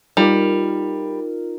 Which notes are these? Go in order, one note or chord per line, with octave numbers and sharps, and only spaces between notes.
G3 D#4 F4 A#4